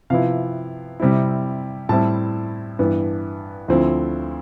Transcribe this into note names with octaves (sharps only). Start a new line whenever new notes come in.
C3 F3 B3 E4 F5
C3 G3 C4 E4
A2 G3 C4 E4 A5
G2 E3 B3
D2 D3 F3 C4 E4